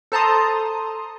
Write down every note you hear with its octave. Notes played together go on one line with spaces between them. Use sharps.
A4 C5 A5 A#5 C6 D#6